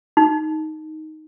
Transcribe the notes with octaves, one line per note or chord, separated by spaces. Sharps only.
D#4